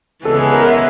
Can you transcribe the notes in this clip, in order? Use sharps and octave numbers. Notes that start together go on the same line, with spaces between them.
C#3 E3 G#3 B3 A4
G#4
A#4
E5